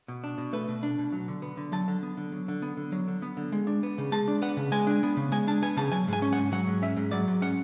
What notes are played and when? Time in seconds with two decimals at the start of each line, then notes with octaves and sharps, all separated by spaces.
0.08 B2
0.24 D4
0.38 B2
0.53 A3 B4
0.68 B2
0.83 D4
0.99 B2
1.13 F#3
1.28 D3
1.42 B3
1.57 D3
1.72 F#3 A5
1.88 D3
2.03 B3
2.17 D3
2.32 F#3
2.48 D3
2.62 B3
2.77 D3
2.92 F#3
3.08 D3
3.22 B3
3.37 D3
3.52 G#3
3.67 D4
3.83 B3
3.98 C#3
4.12 G#3 A5
4.28 D4
4.42 B3 F#5
4.57 C#3
4.72 G#3 G#5
4.87 D4
5.03 B3
5.17 C#3
5.32 G#3 G#5
5.47 D4 A5
5.62 B3 G#5
5.77 C#3 A5
5.92 F#3 G#5
6.08 G#2 G#5
6.22 C#4
6.33 F#5
6.37 G#2
6.52 F#3 F#5
6.67 G#2
6.82 C#4 E5
6.96 G#2
7.11 F#3 D5
7.28 G#2
7.42 C#4 F#5